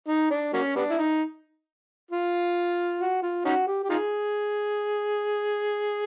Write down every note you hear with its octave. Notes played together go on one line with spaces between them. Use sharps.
D#4
D4
F#3 A#3 C#4
G3 B3 D4
E4
D#4
F4
F#4
F4
C#4 D#4 F#4
G4
G4
D#4 F4 G#4